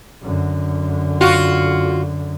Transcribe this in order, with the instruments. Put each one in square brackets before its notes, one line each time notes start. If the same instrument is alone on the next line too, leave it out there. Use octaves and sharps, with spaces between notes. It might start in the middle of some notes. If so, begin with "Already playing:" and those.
[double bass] F#2 D3
[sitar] F4 F#4